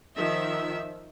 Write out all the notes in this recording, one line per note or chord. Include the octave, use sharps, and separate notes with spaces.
D#3 F3 E5